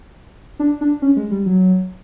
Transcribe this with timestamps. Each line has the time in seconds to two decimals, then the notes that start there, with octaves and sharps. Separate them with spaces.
0.59 D4
0.81 D4
1.02 C#4
1.16 G#3
1.31 G3
1.46 F#3